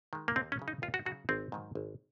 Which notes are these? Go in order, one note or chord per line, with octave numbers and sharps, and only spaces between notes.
D#3 G#3
A#3
D#2 C4
C#4
C#3 F#3
D#4
D#2 F4
F#4
C#3 F#3 F#4
G#1 C4
G#2 D#3 F#3
G#1